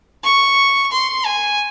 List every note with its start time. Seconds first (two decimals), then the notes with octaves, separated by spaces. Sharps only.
0.23 C#6
0.92 C6
1.25 G#5